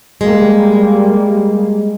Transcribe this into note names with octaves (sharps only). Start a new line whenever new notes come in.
G3 G#3 A#3